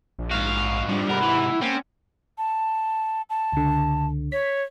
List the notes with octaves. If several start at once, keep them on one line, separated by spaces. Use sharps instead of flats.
A#1
G#2 F#4 F5
D3 F3 G3
G#2 C3 A#4 F#5 B5
E3 E4
A#3 C4 C#4
A5
A5
C#2 D3
C#5 B6